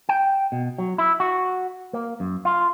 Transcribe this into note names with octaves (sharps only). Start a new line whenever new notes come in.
G5
B2
F#3
E4
F#4
A#3
F#2
F4